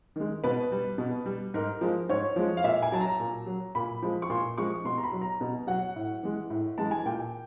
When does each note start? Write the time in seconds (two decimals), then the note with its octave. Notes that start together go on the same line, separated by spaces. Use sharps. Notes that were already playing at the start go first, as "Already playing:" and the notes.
0.16 D#3 G#3
0.44 B2 B4
0.72 G3
0.98 B2
1.26 G3
1.54 G#2 A#4
1.81 F3 G#3
2.09 G#2 C#5
2.36 F3 G#3
2.57 F5
2.64 A#2 E5
2.82 G#5
2.92 F#3 A5
3.00 A#5
3.19 A#2
3.46 F#3
3.75 A#2 B5
4.02 F3 G#3
4.22 C#6
4.29 A#2 C6
4.58 F3 G#3 C#6
4.84 B2 C6
4.98 A#5
5.03 B5
5.12 F#3
5.22 A#5
5.41 B2
5.67 F#3 F#5
5.96 A2
6.23 E3 G#3
6.50 A2
6.78 E3 G#3 A5
6.91 G#5
7.06 A#2 G5